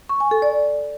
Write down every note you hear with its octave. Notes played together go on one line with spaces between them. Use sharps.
C#6
G#5
A4
D5